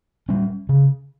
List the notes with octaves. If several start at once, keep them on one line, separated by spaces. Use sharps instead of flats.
G3 C#4
C#3